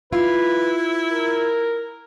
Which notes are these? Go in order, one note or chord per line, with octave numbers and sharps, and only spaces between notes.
E4 F4 B4
A#4